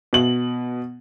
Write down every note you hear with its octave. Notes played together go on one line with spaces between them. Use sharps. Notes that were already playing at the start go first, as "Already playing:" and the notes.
B2 F#7